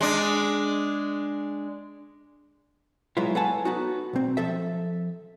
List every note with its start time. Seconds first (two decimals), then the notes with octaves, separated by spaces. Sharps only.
0.01 G#3 D4
3.17 F#3 G#3 B3 E4 F4
3.35 A4 B4 C#5 F#5 G#5 A5
3.65 B3 D#4 F#4
4.13 B1 C4
4.37 F3 A4 E5